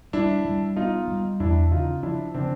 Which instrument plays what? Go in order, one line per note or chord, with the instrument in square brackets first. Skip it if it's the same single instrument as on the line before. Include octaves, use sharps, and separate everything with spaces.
[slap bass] G3 [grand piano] D4 E4
[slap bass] G3
[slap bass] B3 [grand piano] D#4 F4
[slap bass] G3
[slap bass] E2 [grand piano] D4 E4
[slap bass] C#3 [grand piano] D#4 F4
[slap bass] F3 [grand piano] D4 E4
[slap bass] C#3 [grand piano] C4 D4